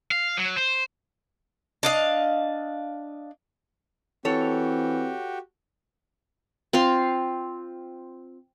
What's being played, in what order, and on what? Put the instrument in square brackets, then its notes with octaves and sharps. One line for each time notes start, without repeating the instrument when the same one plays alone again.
[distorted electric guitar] F5
F#3
C5
[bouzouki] D4 D#5 F5
[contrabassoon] E3 [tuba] C4 [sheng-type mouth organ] F#4 G4 [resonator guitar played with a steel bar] A4 C#5
[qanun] C4 F4 F5 C6